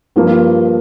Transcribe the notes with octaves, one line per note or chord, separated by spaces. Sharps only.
G2 F3 A#3